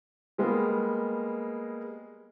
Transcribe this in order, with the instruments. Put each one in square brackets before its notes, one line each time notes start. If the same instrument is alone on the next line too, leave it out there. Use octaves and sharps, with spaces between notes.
[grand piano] G3 G#3 A#3 B3